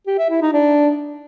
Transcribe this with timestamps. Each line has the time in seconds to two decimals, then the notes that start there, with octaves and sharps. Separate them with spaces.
0.07 G4
0.19 E5
0.30 E4
0.42 D#4
0.53 D4